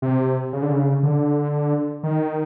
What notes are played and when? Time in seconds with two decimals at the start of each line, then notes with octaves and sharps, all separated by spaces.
0.02 C3
0.53 C#3
0.62 D3
0.72 C#3
1.03 D3
2.03 D#3